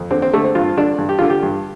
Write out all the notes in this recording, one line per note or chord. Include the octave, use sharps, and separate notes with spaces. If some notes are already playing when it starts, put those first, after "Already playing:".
Already playing: F2
D3 C4
C4
D3 A3
C4
G2 F4
D3 D4
G2
G4
D3 F4
G4
G2